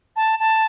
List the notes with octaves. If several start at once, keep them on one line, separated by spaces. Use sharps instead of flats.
A5
A5